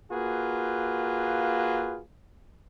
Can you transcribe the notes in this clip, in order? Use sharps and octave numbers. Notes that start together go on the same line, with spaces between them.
A#3 F4 F#4 G#4 B4